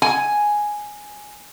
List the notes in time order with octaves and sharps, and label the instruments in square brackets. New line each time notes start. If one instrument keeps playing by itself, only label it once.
[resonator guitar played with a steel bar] G#5